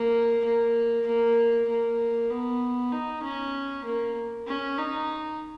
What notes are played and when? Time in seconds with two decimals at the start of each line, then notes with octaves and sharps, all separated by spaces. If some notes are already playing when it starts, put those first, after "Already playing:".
Already playing: A#3
0.44 A#3
1.06 A#3
1.69 A#3
2.30 B3
2.92 D#4
3.23 C#4
3.85 A#3
4.47 C#4
4.78 D#4